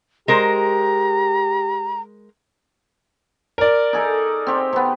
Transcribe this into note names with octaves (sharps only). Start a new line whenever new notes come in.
G#3 G4 A#4 C5 A#5
A#4 D5
D#4 G#4 A4
C4 G4
C3 B3